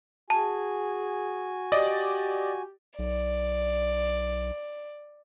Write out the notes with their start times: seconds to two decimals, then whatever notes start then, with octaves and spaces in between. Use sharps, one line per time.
0.30 F#4 G#4 G#5 A5
1.72 G4 D5 D#5
2.99 B1 D5